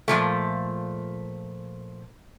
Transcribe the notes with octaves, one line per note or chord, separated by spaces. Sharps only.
A#2 F3 A3